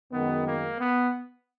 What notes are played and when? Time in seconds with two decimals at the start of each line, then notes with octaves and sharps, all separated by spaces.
0.12 F#2 D#3 G#3 B3
0.46 A#3
0.78 B3